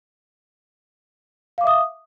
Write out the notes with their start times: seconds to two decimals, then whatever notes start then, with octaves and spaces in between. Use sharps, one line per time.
1.58 F5
1.61 D6
1.64 E5
1.67 D#6